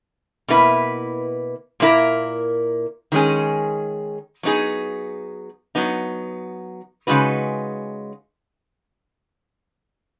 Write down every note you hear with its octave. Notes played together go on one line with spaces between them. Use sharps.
B2 A#3 E4 B4
A#2 A#3 E4 A#4
D#3 G#3 C#4 G#4
F#3 B3 D#4 G#4
F#3 B3 D#4
C#3 G#3 D#4 F#4 B4